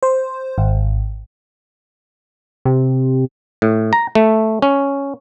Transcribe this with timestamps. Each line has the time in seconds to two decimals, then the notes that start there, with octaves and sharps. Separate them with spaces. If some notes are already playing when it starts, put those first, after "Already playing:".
0.03 C5
0.58 G#1
2.65 C3
3.62 A2
3.93 A#5
4.15 A3
4.62 C#4